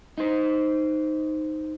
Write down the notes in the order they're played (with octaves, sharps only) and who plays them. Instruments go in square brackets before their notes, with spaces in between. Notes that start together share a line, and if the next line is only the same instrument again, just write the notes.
[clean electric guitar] D#4 C5